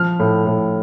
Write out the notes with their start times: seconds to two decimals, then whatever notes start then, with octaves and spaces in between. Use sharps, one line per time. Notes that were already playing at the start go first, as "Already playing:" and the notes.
Already playing: F3 F6
0.20 A2
0.46 A2